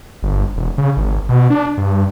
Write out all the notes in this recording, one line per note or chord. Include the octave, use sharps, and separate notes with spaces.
G1
E1
C#3
G#1
B2
D4
G2